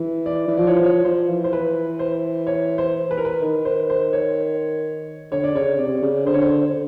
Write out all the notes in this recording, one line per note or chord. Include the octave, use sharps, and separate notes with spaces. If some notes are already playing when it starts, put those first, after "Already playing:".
Already playing: E3
D5
E3
F3 D5
C#5
C5
F3 C#5
F3 C5
E3
C5
B4
C5
C#5
C5
B4
A#4
B4
D#3
C5
C5
C#5
D3 C#5
D5
C#3 C#5
C3 D5
C#3
D3 C5
C#5
C5